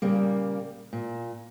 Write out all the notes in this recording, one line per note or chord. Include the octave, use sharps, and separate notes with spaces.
A#2 C#3 G3 A#3
A#2